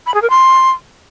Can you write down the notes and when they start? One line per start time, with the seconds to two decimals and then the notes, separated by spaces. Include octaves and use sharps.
0.07 B5
0.14 G#4
0.22 A#4
0.30 C6